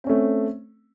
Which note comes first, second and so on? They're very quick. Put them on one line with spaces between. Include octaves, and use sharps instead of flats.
C4 C#4 A3